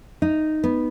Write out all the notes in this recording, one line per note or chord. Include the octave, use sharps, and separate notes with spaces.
D#4
B3